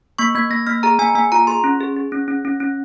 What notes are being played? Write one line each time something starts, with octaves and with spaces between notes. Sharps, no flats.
A#3 C#6
A#3 G#6
A#3 A#6
A#3 F6
G#4 A#5
A#3 G#5
A#3 G#5
F4 A#5
G#4 C6
C#4
G#4
G#4
C#4
C#4
C#4
C#4